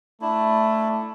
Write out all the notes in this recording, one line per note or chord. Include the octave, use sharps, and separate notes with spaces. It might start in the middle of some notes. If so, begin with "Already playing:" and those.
A3 D4 E4